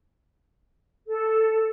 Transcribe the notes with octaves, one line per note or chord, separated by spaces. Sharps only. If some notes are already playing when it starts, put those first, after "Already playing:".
A4